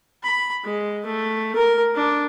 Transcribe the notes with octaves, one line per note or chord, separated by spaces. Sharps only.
B5
G#3
A3
A#4
D4